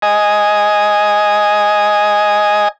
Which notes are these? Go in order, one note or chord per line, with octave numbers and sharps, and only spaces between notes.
D#5 G#5